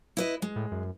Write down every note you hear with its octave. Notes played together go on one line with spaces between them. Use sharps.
E4 B4 D#5
G#3
A2
F#2